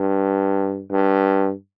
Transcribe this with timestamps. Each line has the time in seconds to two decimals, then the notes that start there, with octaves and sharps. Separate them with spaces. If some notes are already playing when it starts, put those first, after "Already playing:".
Already playing: G2
0.91 G2